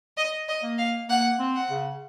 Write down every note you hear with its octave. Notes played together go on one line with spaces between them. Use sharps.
D#5
D#5
A#3
F5
A#3 F#5
C4
F#5
C#3